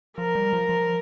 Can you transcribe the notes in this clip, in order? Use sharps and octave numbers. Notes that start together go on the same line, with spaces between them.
F3 A#4
G3
F3
F3